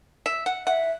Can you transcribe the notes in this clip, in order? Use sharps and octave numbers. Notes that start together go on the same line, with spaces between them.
E5
F#5
E5 F#5